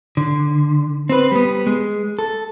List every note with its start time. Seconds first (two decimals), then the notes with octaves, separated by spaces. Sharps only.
0.17 D3
1.09 C4 B4
1.31 G3 B3
1.67 G#3
2.19 A4